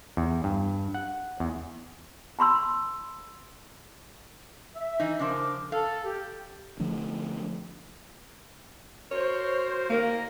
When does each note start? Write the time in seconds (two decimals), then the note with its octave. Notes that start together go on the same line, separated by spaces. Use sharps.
0.17 E2
0.44 G2
0.94 F#5
1.40 E2
2.39 A5 B5 C6 E6
4.75 E5
5.00 E3 D#4
5.19 C#3 F3 D4 A#4 C5 D6
5.72 A4 F5
6.05 G4
6.80 D3 F3 A3 D4
9.11 F#4 A#4 C5 C#5
9.90 A#3 A#4